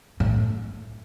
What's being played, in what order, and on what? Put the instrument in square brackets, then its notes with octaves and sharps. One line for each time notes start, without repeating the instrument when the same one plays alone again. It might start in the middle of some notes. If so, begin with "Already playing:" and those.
[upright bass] A2